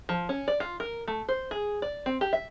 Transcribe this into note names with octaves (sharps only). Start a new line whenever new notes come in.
F3
C#4
D5
F4
A#4
A3
C5
G#4
D5
C4
G4
E5